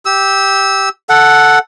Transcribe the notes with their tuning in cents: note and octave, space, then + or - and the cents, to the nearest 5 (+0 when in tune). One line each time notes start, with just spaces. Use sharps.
G4 -5 E6 -20
A4 +0 F#5 +0